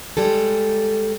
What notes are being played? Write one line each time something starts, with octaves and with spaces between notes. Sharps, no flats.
G3 G#3 A4